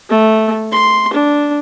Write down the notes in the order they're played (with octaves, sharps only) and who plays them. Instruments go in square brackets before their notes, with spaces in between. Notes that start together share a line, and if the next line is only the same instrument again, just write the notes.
[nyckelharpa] A3
C6
D4